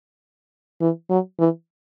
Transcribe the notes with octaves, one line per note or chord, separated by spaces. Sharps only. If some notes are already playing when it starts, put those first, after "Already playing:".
E3
F#3
E3